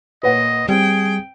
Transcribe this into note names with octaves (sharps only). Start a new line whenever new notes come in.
A#2 B4 C#5 D#5 F#5
G3 C4 G#4 G5